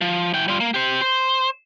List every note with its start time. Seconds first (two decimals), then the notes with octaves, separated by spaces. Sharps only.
0.01 F3
0.34 E3 G5
0.48 G3 F4
0.60 A#3
0.74 G4 C5
1.02 C5